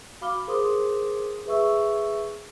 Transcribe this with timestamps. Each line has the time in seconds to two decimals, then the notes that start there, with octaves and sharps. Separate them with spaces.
0.21 F#4 F5 B5 D6 F6 G7
0.48 G#4 A#4 C5 C6 D6 D#6
1.46 G#4 B4 E5 C#6 E6